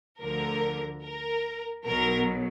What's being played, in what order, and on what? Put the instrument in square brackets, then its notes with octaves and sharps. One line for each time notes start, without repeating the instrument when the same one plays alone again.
[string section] D2 D3 F3 A#4
A#4
B1 B2 F#3 A#4